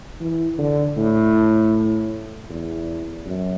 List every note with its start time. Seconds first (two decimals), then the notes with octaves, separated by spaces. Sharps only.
0.21 E3
0.58 D3
0.98 A2
2.50 E2
3.26 F#2